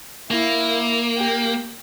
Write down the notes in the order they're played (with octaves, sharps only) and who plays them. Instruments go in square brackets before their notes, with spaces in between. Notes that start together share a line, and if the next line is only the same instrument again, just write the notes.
[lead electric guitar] A#3 [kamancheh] E4
[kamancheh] G4